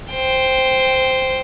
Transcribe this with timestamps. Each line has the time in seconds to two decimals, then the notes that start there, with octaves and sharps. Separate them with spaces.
0.12 C5 G5